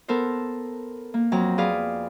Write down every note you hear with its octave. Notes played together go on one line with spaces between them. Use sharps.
B3 A4 A#4 C5
A#3
F2 F#3 C4 A#5
G#4 B4 D5 F5